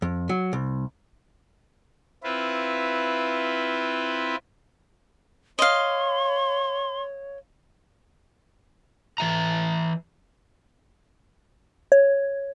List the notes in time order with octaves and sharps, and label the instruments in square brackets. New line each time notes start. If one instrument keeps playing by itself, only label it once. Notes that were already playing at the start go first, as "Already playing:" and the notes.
[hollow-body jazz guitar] F2
F#3
C2
[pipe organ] C4 E4 F4 B4
[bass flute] C#5 [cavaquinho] D#5 F5 [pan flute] C6
[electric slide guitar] E3 E5 A#5
[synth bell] C#5